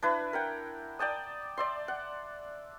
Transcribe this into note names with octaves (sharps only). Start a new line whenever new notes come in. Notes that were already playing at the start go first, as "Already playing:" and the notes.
D4 E4 B4
A#4 F#5 G5
D5 G5 A5 D#6
D5 E5 C6
F#5